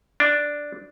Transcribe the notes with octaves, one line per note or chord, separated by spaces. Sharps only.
D4